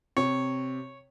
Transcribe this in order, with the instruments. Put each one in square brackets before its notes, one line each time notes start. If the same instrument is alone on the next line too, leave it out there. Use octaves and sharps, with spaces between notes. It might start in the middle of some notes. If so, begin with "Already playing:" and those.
[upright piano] C3 [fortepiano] C#5